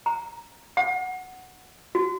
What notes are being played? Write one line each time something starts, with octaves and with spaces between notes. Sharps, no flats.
A#5
F#5
F#4